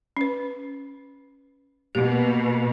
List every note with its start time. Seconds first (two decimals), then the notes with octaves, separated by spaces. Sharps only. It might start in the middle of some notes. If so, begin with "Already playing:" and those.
0.17 C#4 B4
1.95 B2 A#3 G4